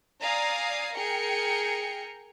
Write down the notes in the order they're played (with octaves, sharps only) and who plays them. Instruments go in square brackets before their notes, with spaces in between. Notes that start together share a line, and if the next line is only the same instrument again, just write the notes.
[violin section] D5 F5 G#5 A#5 D#6
G#4 A#4 G5 C#7